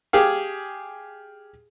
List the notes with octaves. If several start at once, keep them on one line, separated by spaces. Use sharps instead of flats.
G4 G#4 F5